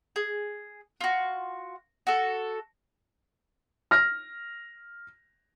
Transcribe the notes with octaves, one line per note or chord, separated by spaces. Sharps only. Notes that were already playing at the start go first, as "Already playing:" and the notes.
G#4
F4 F#4
F#4 A4
F6 A#6